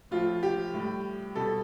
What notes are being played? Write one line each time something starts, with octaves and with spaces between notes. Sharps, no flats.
A2 F3 F4
G4
A2 G3
B2 G3 A4